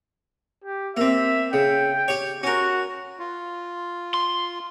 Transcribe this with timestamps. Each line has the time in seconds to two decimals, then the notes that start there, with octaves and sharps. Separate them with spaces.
0.64 G4
0.97 A#3 C4 E5
1.53 C#3 G5
2.08 G4 C#5
2.43 C#4 F#4 A#4
3.19 F4
4.14 C6